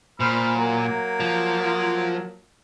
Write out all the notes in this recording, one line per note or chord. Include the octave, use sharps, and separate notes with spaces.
A#2 C5 B5 F6
F#3 A#3
F3